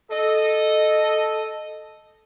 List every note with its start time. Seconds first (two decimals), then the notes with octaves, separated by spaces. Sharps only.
0.11 A4 D#5